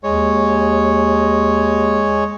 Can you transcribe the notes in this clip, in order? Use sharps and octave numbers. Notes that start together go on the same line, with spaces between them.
D#2 G#3 C#5